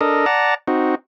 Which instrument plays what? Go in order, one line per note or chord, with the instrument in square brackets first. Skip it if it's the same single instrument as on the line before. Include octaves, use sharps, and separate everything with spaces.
[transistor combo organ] D4 A4 A#4 D#5
D5 F#5 A5 A#5
C4 D#4 F#4